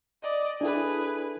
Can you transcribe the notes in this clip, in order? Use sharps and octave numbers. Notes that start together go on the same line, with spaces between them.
D5 D#5
D4 E4 G#4 A4 B4